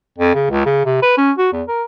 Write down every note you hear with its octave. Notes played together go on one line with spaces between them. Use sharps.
F2
C#3
C#2
C#3
C3
B4
C#4
F#4
E2
A#4